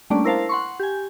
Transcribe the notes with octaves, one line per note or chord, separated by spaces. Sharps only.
G3 A3 A#3 C#4 D4 D5
E4 A#4 C5 F5 A5
F#5 C6 C#6
G4 G#5